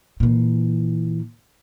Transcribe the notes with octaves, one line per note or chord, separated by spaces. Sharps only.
A#2 E3